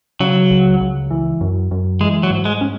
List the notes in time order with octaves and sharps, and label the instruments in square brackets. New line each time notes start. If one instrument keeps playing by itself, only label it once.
[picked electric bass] C#3 [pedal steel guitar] F#3
[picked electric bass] C#2
C#2
E3
F#2
F#2
[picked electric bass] E3 [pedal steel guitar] G#3
[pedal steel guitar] F#3
[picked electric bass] G#2
[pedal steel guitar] G#3
[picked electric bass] C#4